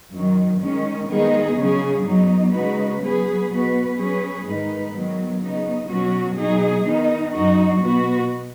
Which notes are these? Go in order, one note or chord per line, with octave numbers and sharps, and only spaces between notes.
F#2 D#3 F#3
D#3 G#3 C#4
D#3 G#3 B3 D#4 G#4
C#3 F#3 C#4 G#4
F#2 F#3 B3 D#4
C#3 G#3 D#4 F#4 B4
F#3 B3 G#4 B4
B2 B3 F#4 B4
F#3 C#4 G#4 B4
G#2 D#3 G#3 D#4 B4
D#3 F#3 B3
C#3 B3 D#4
B2 F#3 C#4 F#4
B2 F#3 D#4 G#4
D#3 B3 D#4
F#2 F#3 D#4 F#4
B2 B3 F#4 B4